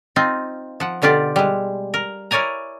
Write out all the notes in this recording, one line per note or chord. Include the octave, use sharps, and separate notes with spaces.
C4 D#4 F4
F3 F#5
B2 D3 F4 G4 D5
G3 G#3
A#4
E4 A#4 C#5 D5 G#5 A#5